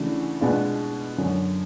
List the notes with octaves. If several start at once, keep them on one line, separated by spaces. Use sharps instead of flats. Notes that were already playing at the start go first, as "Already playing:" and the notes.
Already playing: C#3 E3 A3 D4 F#4
B2 G#3 B3 D4 F4
F#2 D3 F#3